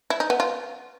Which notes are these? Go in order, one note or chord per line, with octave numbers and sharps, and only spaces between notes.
E4
D#4
B3
F4